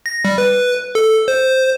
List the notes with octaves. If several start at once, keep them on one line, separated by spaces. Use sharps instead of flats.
A#6
G3
B4
A4
C5